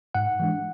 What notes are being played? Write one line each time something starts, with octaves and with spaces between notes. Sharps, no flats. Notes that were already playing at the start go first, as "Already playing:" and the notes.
G#2 F#5
E3 G#3 D4